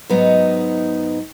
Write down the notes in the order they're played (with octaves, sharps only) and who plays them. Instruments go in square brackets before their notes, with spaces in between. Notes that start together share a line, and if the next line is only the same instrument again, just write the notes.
[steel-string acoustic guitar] G#2 F#3 B3 D#4